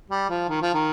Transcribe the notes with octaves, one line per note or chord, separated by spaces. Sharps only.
G3
F3
D#3
F3
D#3